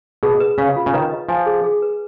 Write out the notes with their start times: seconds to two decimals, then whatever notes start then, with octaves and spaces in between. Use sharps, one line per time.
0.23 B2 G#4
0.40 B4
0.58 C#3 F5
0.76 F4
0.86 C#3
0.93 D#3 B4
1.11 D#5
1.29 F3 G#5
1.46 G#4
1.64 G#4
1.82 B4